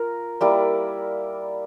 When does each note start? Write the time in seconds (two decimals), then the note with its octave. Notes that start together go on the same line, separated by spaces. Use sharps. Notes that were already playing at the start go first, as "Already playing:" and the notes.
Already playing: F4 A#4
0.41 G3 A#3 E4 D5